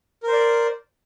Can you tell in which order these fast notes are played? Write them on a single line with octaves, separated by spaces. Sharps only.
A#4 C5 D5